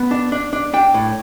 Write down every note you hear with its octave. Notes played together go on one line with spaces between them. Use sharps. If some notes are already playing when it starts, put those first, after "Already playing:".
Already playing: B3
D4
D4
D4
D4 G5
A2